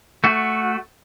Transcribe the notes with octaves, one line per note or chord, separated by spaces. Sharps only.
A3 F#4